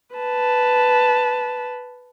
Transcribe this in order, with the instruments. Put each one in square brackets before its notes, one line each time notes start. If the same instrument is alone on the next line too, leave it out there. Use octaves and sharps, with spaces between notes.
[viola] B4 A5